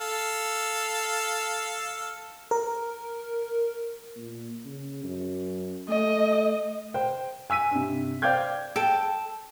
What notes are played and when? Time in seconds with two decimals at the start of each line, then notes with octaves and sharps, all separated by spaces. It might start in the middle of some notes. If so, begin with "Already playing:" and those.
0.01 A4 F5
2.51 A#4
4.17 A#2
4.65 C#3
5.04 F#2
5.89 A3 D#5
6.94 C5 G5
7.50 G#5 E6 B6 D#7
7.71 G2 C3
8.22 C5 D5 F5 G5 G6 G#6
8.76 A4 G5